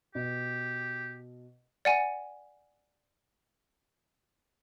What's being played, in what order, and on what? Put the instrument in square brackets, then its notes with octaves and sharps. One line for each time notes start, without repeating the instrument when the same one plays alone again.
[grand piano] B2 [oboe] G4
[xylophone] D5 F#5 G#5